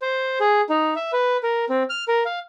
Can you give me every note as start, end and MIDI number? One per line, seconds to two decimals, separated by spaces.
0.02 0.39 72
0.40 0.61 68
0.69 0.94 63
0.96 1.12 76
1.13 1.37 71
1.43 1.65 70
1.69 1.83 60
1.90 2.04 89
2.08 2.23 70
2.25 2.39 77